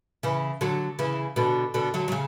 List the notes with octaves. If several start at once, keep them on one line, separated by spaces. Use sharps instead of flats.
C#3 E3
D3 F#3
C#3 E3
B2 D3
B2 D3
D3 F#3
F#3
C#3